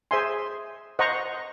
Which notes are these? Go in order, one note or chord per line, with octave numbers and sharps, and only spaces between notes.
G#4 C5 E5 G#5 C6
C5 D#5 F#5 A#5 C#6